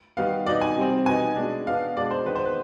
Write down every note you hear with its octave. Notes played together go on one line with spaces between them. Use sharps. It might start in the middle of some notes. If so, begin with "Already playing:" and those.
D#3 G3 B3 F5
B2 B3 D#4 D5
G#5
C3 G3 C4
B2 B3 D#4 G#5
B2 G#3 D4
B2 B3 D4 F5
B2 G#3 D4 D5
C5
D#3 G#3 B3 B4
C5
B4